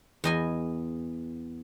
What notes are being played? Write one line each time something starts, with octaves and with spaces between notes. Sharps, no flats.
E2 D#5 G#5